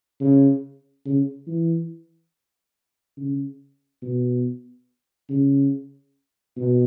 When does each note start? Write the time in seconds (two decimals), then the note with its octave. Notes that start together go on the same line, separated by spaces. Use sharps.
0.20 C#3
1.05 C#3
1.47 E3
3.17 C#3
4.02 B2
5.29 C#3
6.57 B2